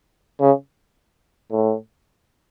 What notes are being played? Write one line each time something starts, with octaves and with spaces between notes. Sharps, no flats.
C#3
A2